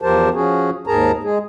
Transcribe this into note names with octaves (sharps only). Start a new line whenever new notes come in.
E2 F3 G4 A#4 C5 A5
F3 C#4 F#4 G#4
D#2 G#2 G#4 A#4 A5 A#5
G#3 G#4